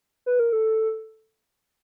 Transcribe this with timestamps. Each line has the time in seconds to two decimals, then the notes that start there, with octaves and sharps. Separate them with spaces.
0.26 B4
0.39 A#4
0.53 A4